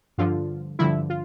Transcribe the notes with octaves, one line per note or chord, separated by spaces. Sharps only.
G2 D3 F3 F4
G2 D3 F3 E4
F4